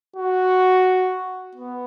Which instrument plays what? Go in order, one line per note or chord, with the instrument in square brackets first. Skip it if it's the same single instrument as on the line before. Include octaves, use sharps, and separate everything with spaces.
[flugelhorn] F#4
B3